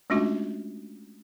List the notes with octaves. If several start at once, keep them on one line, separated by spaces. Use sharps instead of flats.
G#3 A3 C#4 D4 F4 F#4